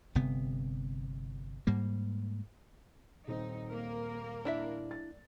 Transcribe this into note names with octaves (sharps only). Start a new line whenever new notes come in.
G1 C3 B3
G#2 G3 A#3
D#1 C4 D#4
A#3 A#4
D4 E4 E5
D5 A6